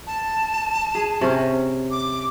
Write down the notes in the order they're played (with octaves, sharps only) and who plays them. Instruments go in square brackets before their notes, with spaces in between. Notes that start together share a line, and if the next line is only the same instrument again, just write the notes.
[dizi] A5
[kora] G#4
C3 C#4
[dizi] D6